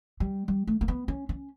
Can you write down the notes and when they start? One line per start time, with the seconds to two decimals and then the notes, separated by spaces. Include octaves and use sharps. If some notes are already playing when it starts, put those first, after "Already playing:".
0.20 G3
0.48 G3
0.67 A3
0.81 A#3
0.88 B3
1.08 C#4
1.29 C#4